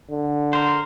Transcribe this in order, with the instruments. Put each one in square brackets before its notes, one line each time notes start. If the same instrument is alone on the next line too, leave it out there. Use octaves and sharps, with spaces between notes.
[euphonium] D3
[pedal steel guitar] A#4 C5